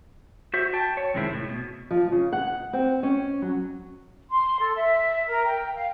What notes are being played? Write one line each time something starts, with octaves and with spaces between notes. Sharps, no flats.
F#4 C5 E5
G5 A5
C#5
F2 C3 D#3 G#3 C4 E4
A2
B2
F3
C#3
F#5
C4
C#4
F#3
C6
A4
E5
A#4
G5
F5